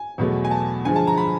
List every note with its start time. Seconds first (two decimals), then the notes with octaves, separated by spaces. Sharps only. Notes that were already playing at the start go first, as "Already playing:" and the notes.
Already playing: G#5
0.18 E2 B2 F#3 A3
0.45 G#5
0.51 A5
0.85 G2 D3 F3 G#3 G#5
0.96 A5
1.07 A#5
1.18 B5